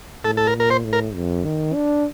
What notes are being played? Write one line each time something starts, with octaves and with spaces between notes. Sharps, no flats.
A2 A4
A4
A#4
A#2
A#4
C5
A2
A#4
F2
D#3
D4